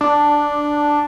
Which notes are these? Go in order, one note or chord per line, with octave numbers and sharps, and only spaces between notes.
D4